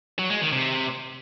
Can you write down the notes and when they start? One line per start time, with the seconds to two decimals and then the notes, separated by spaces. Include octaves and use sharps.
0.19 F#3
0.30 G#3
0.41 D#3
0.53 C3